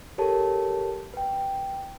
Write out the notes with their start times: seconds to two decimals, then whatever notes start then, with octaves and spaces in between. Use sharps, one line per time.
0.18 G4 A4 A#4 C#5 A5
1.14 B4 G5